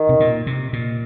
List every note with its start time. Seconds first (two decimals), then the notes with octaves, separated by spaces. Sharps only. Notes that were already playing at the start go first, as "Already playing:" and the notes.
Already playing: D#3
0.09 C3
0.20 A#2
0.47 C3
0.73 A#2